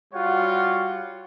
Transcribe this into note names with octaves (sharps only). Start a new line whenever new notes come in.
G3 F4 F#4 C#5 F#5